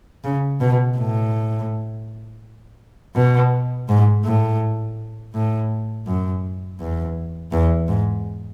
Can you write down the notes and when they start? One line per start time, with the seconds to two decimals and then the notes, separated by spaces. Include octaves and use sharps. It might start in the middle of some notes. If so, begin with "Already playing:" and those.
0.24 C#3
0.61 B2
0.97 A2
3.15 B2
3.89 G#2
4.24 A2
5.34 A2
6.07 F#2
6.79 E2
7.52 E2
7.88 G#2